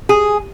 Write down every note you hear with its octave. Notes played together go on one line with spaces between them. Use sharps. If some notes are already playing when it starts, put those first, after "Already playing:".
G#4